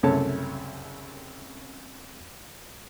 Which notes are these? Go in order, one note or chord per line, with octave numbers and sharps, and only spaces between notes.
C2 F#2 C#3 A3 C#5 A5